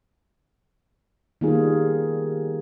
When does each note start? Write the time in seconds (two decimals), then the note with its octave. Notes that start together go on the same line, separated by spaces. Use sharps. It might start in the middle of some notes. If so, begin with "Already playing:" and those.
1.41 D#3 G3 A#3 B3 F4 G#4